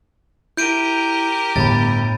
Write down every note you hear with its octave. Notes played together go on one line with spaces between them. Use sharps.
E4 G4 A#4 G6 D7 D#7
G1 A2 B5 A6